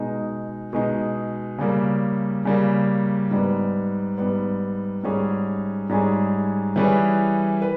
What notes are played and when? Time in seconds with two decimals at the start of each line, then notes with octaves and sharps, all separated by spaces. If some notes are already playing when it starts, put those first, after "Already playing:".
Already playing: B2 G#3 D#4
0.73 B2 G#3 D#4
1.58 C#3 G3 A#3
2.45 C#3 G3 A#3
3.31 G#2 G3 B3
4.18 G#2 G3 B3
5.03 G#2 G3 C#4 G#4
5.89 G#2 G3 C#4 G#4
6.76 E3 G3 C#4 G#4 B4
7.62 B4